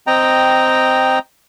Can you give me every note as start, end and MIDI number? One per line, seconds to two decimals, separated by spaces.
0.07 1.19 60
0.07 1.19 75
0.07 1.19 79
0.07 1.19 82